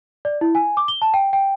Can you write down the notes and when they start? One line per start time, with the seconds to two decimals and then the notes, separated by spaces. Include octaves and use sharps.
0.25 D5
0.41 E4
0.55 G#5
0.77 D6
0.88 G7
1.02 A5
1.14 G5
1.33 G5